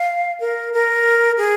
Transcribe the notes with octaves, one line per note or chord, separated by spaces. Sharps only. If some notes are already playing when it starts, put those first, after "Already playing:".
Already playing: F5
A#4
A#4
G#4